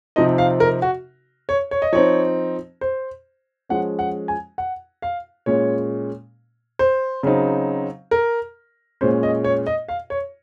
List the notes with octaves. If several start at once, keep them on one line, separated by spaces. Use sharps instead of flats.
C3 F3 C4 D#4 D#5
F5
A#4
F#4
C#5
C#5
D#5
F3 C4 D#4 C#5
C5
F3 G#3 C#4 F#5
F#5
G#5
F#5
F5
A#2 G#3 C#4 C#5
C5
C#3 F#3 C4 D#4
A#4
A#2 G#3 C#4 C5
D#5
C#5
D#5
F5
C#5